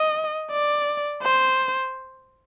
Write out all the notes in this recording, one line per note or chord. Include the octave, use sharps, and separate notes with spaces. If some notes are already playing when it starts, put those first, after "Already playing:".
Already playing: D#5
D5
C5